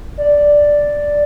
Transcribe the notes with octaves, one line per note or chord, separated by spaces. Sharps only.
D5